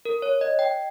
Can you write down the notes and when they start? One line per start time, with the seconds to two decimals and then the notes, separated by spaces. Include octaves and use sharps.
0.05 A#4
0.22 C#5
0.41 D#5
0.59 G5